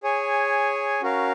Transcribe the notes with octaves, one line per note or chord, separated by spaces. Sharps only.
G#4 C#5 G#5
C#4 F#4 A#4 F5